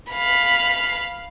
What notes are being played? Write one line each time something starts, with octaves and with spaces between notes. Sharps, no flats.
F5 B5